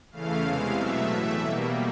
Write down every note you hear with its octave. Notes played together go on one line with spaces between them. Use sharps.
E2 C#3 E3 A3 F5
E2 C3 E3 G#3
B2 F#3 A3 E5
A2 E3 A3
B2 G3 A#3